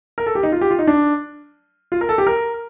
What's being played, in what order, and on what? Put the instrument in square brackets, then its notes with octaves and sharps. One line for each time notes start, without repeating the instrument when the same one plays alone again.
[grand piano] A#4
A4
G4
D#4
F4
G4
F4
D#4
D4
F4
A#4
A4
G4
A#4